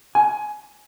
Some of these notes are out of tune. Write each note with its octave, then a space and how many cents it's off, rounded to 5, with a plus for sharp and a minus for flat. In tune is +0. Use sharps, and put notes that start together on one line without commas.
G#5 +15